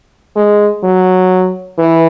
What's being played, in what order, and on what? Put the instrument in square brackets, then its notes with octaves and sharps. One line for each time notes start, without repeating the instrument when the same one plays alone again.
[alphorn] G#3
F#3
E3